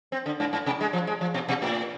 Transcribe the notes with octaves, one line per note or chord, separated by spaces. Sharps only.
C4
D3
G#2
G#2
C3
G#3
F3
G#3
F3
B2
B2
A2